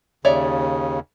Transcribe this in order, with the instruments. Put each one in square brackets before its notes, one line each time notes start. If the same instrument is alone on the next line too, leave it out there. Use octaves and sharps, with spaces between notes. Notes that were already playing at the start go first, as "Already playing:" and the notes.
[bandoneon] D#2 C#3 [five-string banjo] C#5 D5 E5